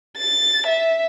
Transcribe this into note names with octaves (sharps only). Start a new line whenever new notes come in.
A6
E5